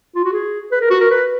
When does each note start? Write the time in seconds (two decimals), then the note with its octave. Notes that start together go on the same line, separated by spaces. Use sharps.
0.15 F4
0.25 F#4
0.33 G#4
0.72 B4
0.81 A#4
0.90 F#4
1.00 A#4
1.10 B4